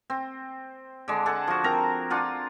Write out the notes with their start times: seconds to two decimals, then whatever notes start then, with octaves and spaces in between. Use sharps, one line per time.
0.10 C4
1.08 D3 G#3
1.26 G#4 A4 F#5
1.48 F3 F#4
1.64 C4 A#4 A#5
2.10 D4 F4 F#5